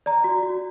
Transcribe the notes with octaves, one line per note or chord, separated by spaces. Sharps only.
D5 A#5
F#4
F#4